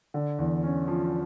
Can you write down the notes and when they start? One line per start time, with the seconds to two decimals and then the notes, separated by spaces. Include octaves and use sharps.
0.14 D3
0.39 E2
0.64 C#4
0.88 F3